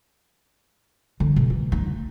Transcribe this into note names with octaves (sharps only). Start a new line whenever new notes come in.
D3
B2
E3
D#4
A3